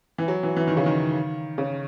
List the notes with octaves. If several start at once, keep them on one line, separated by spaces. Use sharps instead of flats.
E3
F#3
E3
E3
D#3
C#3
D#3
C#3